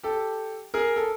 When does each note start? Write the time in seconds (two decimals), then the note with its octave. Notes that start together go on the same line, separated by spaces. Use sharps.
0.03 G4 A4
0.74 G#4 A#4
0.96 A4